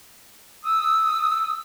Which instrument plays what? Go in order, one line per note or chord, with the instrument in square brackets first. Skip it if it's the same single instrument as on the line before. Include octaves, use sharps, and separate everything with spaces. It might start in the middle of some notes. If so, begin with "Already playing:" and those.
[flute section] D#6 E6